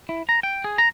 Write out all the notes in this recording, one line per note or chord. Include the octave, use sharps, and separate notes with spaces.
E4
A#5
G5
G#4
A#5